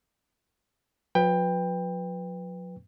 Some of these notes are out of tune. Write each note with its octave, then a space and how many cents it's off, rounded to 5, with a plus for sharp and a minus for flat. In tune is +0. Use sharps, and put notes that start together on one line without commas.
F#3 -45 B4 +0 G5 +20